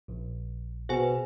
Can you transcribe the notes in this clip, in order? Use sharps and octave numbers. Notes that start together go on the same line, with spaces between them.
A#1
B2 F#4 G#4 B4 C5 G#5